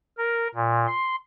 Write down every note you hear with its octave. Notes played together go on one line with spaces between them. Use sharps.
A#4
A#2
C6